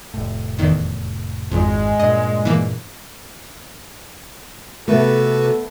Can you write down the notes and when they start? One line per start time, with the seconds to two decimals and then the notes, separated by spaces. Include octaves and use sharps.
0.14 F1 A2
0.59 E2 D#3
1.51 G#1 F2 G#2 G#3
1.99 G2 A#2 D#5
2.45 E3 A#3
4.88 C3 A3 B3 F#4 A4 B4